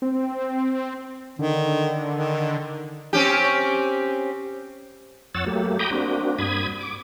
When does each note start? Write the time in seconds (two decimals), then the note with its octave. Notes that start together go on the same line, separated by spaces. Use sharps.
0.02 C4
1.39 D3 D#3
2.16 D#3
3.13 C4 C#4 G4
5.35 F2 C#5 F#5 E6 A6
5.46 F#3 A3 A#3 G4
5.79 G5 A#5 B5 D6 D#6 G6
5.91 A#3 C4 D4 F#4
6.39 G2 B5 D#6 G#6
6.81 D6